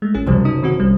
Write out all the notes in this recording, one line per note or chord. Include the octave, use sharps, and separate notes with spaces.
G#3 A3
A1 C#4 G#4 F#6
F#1 C#2 C3 F3 G3
D#4 D#6
D#3 C4 F#4
B1 G3